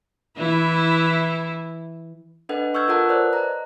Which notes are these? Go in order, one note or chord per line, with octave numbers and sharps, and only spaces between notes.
E3 E4
D4 A4 B4 D#5 F#5
C#6 E6 F6 G6 G#6
F4 A4 A#4 F#5 A5 D#6
B4 C5 D5 F#6
D#5 A#5